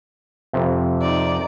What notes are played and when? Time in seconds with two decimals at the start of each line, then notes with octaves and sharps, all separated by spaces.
0.53 F2 C3
1.01 D#4 D5